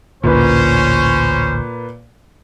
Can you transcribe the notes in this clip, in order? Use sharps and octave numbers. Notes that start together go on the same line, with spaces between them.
A1 D2 A#2 C#4 B4 C5